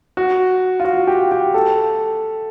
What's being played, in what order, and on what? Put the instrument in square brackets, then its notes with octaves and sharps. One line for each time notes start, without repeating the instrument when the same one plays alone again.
[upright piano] F#4
F4
F#4
G4
G4
A4